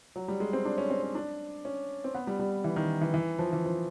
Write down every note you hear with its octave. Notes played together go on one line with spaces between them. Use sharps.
F#3
G3
G#3
C4
D4
C#4
C4
C#4
D4
C#4
C4
B3
G3
G3
E3
D#3
E3
E3
F3
E3
F3